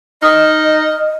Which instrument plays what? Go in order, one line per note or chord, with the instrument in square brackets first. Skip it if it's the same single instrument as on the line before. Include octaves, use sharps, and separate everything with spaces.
[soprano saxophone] D#4 [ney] D#5 [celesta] D#6 F6